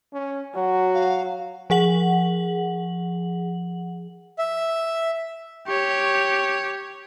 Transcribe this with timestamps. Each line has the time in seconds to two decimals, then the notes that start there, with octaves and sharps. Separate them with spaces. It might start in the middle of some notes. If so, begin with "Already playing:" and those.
0.13 C#4
0.55 F#3 F#4
0.94 F5
1.70 F3 G#4 F#5 F#7
4.38 E5
5.67 G4 C#5